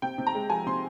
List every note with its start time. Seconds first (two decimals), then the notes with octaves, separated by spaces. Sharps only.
0.02 C3 G5
0.18 C3
0.27 A#5
0.35 G#3
0.50 F3 G#5
0.66 C3 C6